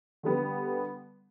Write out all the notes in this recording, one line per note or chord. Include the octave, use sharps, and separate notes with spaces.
D3 G3 B3